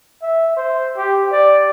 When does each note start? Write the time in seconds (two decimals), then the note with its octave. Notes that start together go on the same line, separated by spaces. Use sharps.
0.23 E5
0.57 C5
0.97 G4
1.32 D5